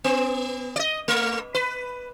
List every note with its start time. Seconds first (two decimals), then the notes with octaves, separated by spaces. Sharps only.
0.04 B3
0.76 D5 D#5
1.08 A3
1.55 B4